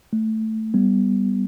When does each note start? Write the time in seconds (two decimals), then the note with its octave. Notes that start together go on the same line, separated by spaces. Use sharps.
0.13 A3
0.74 G3 B3